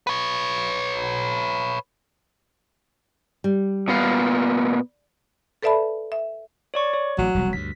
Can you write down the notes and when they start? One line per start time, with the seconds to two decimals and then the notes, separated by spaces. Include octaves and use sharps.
0.07 B4 C#5
3.44 G3
3.88 A#2 B3 F5
5.63 A4 B4 D5 E5 A5 B5
6.12 E5
6.74 C#5 D5 C#6
6.94 C#5
7.18 A1 F#3
7.34 E1 C2 G3
7.53 D2 G2 B6